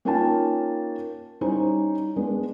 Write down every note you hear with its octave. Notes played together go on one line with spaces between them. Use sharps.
A#3 C#4 D#4 F4 G5 A5
G3 C#4 D#4 E4 C5
G#3 B3 D4